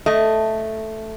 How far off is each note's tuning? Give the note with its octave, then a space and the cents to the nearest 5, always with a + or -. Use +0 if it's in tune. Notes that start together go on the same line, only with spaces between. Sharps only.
A3 +0 D#5 +0